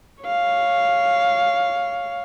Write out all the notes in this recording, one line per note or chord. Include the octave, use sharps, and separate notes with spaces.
C#5 F5